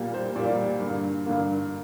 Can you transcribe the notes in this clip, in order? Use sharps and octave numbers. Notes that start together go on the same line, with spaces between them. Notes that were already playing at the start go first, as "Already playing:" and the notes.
Already playing: A#2 G3 A#3
C5
A#2 G3 A#3 D5
G2 D3 A#3
G2 D3 A#3